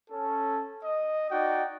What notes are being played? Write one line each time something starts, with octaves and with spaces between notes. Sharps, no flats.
C#4 A4
D#5
D#4 F#4 D5 G5